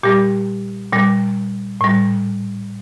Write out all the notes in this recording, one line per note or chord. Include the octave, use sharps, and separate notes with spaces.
A#2 G3 G4
A#2 G3
A2 G3